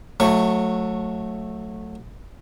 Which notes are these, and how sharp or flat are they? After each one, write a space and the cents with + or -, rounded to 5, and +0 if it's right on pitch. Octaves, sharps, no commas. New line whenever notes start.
F#3 -20 A3 +0 C#6 +0